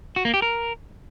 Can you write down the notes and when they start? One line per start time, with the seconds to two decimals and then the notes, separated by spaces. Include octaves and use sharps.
0.16 F#4
0.25 A#3
0.34 G4
0.42 A#4